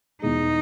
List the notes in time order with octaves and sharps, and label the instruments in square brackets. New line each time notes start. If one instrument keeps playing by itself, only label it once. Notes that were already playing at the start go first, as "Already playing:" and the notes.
[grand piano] E2 B2 G#3 [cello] D#4